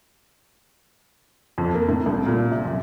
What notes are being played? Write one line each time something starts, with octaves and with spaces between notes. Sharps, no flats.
F2
A#3
A2
C2
A#2
C3
F#2